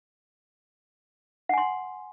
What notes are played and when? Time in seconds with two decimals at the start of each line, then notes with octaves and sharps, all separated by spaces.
1.49 F#5
1.53 G#5
1.58 C6